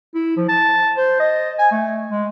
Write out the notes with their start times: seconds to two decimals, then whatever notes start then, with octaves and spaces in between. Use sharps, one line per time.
0.15 E4
0.37 F3
0.49 A5
0.97 C5
1.20 D#5
1.59 G#5
1.72 A3
2.10 G#3